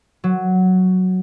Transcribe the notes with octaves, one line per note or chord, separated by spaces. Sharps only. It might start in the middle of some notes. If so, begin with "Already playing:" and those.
F#3